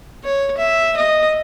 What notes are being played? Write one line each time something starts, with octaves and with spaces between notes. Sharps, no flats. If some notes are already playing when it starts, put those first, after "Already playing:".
C#5
E5
D#5